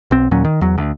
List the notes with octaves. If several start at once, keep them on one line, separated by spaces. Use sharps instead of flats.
B1 C4
D#2 A#2 F#3 C#4
D#3
E2 F#3
D2